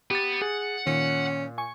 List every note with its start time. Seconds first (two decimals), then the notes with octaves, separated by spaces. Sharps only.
0.11 B3 G4 A6
0.42 G#4 F#5
0.87 A#2 D#3 C#4
1.58 G#5 C#6